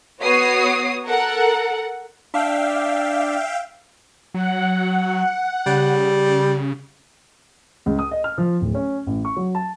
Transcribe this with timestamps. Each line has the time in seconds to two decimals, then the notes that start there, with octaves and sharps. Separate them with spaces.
0.23 B3 F#4 C#5 D#6 C7
1.07 A4 A#4 F#5
2.34 D4 E5 F5 G5
4.34 F#3 F#5
5.66 C#3 G3
7.86 C#2
7.99 D#6
8.11 D#5
8.24 F6
8.38 F3
8.61 D1
8.75 C#4
9.07 A1
9.25 C#6
9.36 F#3
9.55 A5